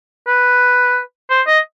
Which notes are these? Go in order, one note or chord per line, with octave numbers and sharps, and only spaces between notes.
B4
C5
D#5